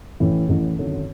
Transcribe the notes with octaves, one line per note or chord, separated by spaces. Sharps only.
A1 A2 E3
A1 A2 E3
G#1 F#2 D3